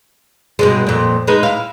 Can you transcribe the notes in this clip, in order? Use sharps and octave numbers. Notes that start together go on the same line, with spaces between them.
G2 B2 G#3
F2 A#2
G#3 D#4 B4
E4 F5